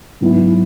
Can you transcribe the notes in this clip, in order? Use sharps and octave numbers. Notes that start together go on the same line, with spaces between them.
G#2 F#3 B3 E4